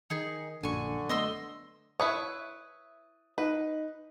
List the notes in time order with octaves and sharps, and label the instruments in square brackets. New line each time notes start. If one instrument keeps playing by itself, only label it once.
[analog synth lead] D#3 [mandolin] D#4 G#4
[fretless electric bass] A#1 [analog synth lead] F#2 [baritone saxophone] D3 [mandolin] G#5 C#6
[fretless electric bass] A3 B3 [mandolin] D#5 C6 E6
[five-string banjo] E4 B4 C#5 [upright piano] D#6
[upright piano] D#4 [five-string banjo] B4